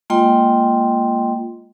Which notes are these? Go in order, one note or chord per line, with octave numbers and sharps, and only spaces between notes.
G#3 A#3 F4 D#5 G5 C6